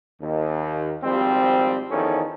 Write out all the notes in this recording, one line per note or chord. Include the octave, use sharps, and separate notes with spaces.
D#2
G#1 F3 G3 C4
E2 D#3 F3 C#4 A4